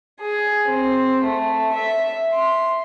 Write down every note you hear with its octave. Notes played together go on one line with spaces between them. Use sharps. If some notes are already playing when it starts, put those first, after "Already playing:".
G#4
C4
A3
E5
C6